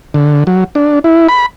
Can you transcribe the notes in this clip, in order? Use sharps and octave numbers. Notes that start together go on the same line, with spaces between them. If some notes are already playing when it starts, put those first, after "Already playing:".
D3
F#3
D4
E4
B5